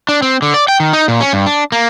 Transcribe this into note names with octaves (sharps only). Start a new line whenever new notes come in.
D4
C4
D3
D5
G5
D#3
D#4
A#2
C#4
G2
D4
A#3